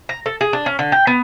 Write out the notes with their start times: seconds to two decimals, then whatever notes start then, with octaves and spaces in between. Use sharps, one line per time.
0.09 A#5
0.26 A4
0.41 G#4
0.53 D4
0.66 C#4
0.79 D3
0.92 G5
1.07 B3